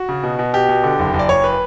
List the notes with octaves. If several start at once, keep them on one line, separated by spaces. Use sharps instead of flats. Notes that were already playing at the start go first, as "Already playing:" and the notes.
Already playing: F#4
C#3
B2
B2
B2 G4
B2
D3
F#1
F#1
D5
F#1 C#5
B4